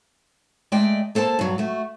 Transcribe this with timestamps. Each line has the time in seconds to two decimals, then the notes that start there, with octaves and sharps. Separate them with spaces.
0.72 G#3 A3 D5 D#5 G5
1.15 A#3 A4 C5 A5
1.39 G2 F#3
1.58 A3 F#4